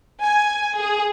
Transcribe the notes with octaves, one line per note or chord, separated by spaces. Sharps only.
G#5
G#4